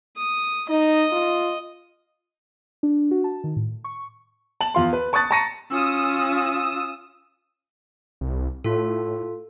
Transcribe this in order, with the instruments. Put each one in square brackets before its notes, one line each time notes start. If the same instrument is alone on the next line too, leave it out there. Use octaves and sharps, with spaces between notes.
[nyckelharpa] D#6
[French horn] D#4 [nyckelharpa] D#5
[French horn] F4
[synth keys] D4
F#4
A5
D#3
A2
C#6
[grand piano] A5 F#7
E2 F4 C6
B4
A5 C#6 D#6 F#6 A6
A5 A#5 C#6 A#6 C#7 D#7
[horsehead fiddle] C#4 F4 [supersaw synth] D#6 E6
[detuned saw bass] C2
[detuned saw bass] A2 [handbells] F4 A4